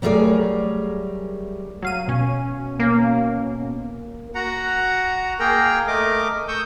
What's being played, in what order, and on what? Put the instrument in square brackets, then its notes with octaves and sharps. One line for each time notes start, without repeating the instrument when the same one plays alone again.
[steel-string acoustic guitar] F#3 G3 A3 G#4 A#4 D5
[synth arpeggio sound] F#3 F5 D#7
B2 C#4
[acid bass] A#3
[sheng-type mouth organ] F#4 F#5 A#5
A#3 G#4 A#4 G5 A#5
A3 A#4 D#5 D6
C#6 D#6 E6 G6